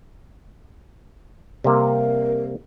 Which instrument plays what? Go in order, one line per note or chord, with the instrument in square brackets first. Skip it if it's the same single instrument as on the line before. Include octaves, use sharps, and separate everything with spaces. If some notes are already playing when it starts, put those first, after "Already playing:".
[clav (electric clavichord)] C3 G3 A#3 [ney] A#4